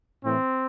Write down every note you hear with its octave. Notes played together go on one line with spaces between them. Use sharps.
A2 E3 C4